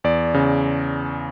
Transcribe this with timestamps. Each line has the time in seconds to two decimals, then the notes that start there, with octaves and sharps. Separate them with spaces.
0.04 E2 D5
0.34 C#3